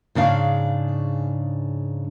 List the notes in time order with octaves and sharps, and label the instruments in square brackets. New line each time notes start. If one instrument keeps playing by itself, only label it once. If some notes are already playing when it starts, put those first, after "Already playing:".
[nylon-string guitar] G#2 C#3 D4 F5